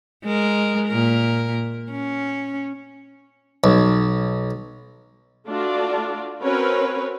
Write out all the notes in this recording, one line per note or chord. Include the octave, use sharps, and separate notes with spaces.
G#3 A#4
A#2 A#4
C#4
B1
A3 D4 F4 F#4 D5
C4 C#4 F#4 A#4 B4 C#5